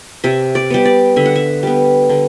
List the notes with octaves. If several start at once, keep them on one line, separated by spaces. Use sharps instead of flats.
C3 E5
D5
G3 B3
D5
D3 E5
F#5
E5
G3 B3
D3